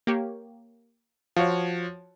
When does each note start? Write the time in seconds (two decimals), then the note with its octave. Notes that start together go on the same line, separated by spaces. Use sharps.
0.07 A#3 G4 C#5
1.36 F3 F4 F#4 C#5